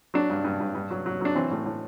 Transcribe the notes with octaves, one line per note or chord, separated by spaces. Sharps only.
F#3 D4
G2
G2
G2
G2
F#3
F#3
F#3 D4
E3 C4
A2
A2